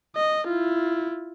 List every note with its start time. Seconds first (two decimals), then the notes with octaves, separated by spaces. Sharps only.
0.16 D#5
0.48 E4 F4